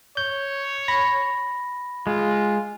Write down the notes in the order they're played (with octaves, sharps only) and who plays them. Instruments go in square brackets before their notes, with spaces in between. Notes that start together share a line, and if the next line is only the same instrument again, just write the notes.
[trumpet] C#5 [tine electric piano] G6
[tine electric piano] B5 A#6
[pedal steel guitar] G#3 [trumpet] F4